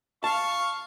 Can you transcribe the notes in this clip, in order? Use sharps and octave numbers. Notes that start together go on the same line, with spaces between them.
F5 A5 C#6